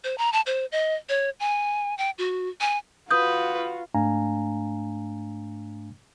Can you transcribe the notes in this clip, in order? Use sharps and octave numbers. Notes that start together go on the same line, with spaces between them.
C5
A#5
A5
C5
D#5
C#5
G#5
G5
F#4
G#5
F4 F#4 B4 D#6 G6
G#2 A3 D4 F5 G#5 A#5